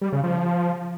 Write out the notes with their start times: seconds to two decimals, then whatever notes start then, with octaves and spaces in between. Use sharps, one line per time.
0.01 G3
0.12 C#3
0.23 F3